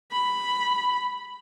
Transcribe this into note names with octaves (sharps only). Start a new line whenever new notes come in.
B5